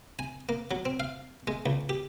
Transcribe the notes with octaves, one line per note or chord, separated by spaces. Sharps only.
G#5
A#3
F#3
C4
F5
G#3
C#2
G4